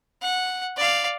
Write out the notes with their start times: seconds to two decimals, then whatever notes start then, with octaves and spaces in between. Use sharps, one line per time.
0.22 F#5
0.77 D5 F5